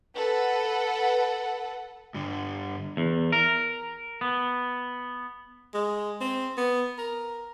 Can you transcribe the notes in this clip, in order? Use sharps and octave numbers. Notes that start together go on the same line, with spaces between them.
A4 B4 F#5
G2 D3
E2
A#4
B3
G#3
C4
B3
A#4